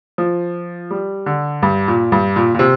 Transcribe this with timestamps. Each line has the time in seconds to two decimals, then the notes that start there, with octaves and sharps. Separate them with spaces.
0.18 F3
0.91 G3
1.26 D3
1.62 G2
1.88 A#2
2.12 G2
2.36 A#2
2.55 A#2
2.59 C3